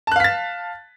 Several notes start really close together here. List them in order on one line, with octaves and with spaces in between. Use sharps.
A5 F#6 F5 B6 A6